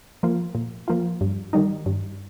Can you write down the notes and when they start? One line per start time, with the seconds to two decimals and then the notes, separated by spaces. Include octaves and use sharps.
0.23 F3 A#3 F4
0.55 A#2
0.88 F3 A#3 F4
1.21 G2
1.53 D#3 G3 D#4
1.86 G2